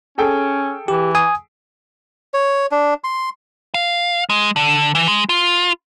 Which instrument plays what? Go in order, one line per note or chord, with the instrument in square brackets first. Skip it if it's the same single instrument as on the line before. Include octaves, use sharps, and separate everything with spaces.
[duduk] C#4 [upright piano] G#4 A4 G5
[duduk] E3 [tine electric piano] G4
[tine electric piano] G#5 D#6
[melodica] C#5
D4
C6
[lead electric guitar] F5
G#3
D3
E3
G#3
F4